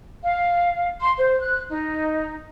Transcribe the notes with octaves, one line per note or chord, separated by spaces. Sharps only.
F5
C6
C5
F#6
D#4